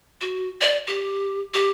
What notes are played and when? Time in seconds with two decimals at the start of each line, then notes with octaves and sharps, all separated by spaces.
0.21 F#4
0.61 D5
0.88 G4
1.54 G4